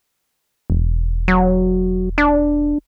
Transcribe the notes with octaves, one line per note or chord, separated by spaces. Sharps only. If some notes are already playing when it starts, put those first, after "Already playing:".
E1
F#3
D4